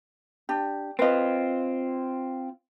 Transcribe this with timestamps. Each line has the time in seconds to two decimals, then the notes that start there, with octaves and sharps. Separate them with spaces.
0.49 D4 G4
0.99 C4 F4 B4 D#5